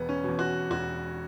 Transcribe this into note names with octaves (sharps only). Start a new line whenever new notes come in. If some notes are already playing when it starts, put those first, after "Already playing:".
Already playing: E1 B3
C#4
E2 B2
F#4
E1 F#4